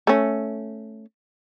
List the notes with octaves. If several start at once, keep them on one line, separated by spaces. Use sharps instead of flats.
A3 C#4